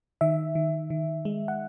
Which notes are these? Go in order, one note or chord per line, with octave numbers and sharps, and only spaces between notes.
D#3 E5
D#3
D#3
G#3
F#5